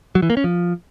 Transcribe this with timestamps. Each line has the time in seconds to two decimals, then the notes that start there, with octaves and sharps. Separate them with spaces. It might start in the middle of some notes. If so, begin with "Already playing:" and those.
0.15 F#3
0.22 E3
0.30 A#3
0.37 C#4
0.44 F3